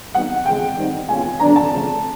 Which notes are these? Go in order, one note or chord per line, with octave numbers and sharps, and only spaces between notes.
G3 B3 D#4 F#4 F#5
C#3 F3 G#3 G5
D#3 G3 C4 D#4
B2 G#3 C#4 F4 G#5
D3 F#3 B3 D4 A#5
A5
C#3 F3 A3